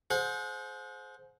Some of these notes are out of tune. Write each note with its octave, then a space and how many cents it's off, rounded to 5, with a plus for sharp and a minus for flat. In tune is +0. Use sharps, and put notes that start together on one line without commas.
G#4 +35 C5 +0 F#5 -35